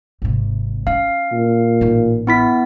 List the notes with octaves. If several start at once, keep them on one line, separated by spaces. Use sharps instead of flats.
G#1 C3
C#4 F5
A#2
A1 D#4
B3 E4 B6